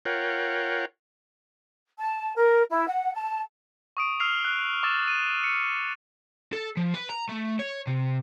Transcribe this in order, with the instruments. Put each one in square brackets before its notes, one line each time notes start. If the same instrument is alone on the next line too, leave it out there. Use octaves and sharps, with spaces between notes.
[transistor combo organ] F4 A#4 C#5 F#5 G5
[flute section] A5
A#4
E4
F#5
A5
[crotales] C#6 D#6 D7
E6 F6 C7 F7
F#6
C#6 D6 E6 A6 E7
D#7
C#7
[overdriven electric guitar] A4
F3
B4
A#5
A3
C#5
C3